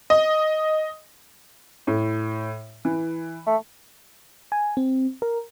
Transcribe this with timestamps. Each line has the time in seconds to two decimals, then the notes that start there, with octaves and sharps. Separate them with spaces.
0.10 D#5
1.87 A2
2.85 E3
3.47 A3
4.52 G#5
4.77 C4
5.22 A#4